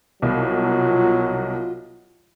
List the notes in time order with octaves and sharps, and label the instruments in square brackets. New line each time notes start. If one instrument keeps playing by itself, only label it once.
[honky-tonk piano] C2 B2 [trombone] F#3 [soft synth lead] F4